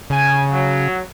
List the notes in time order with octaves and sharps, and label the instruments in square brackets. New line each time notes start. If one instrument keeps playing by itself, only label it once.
[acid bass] C#3 [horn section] G#5
[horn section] F#3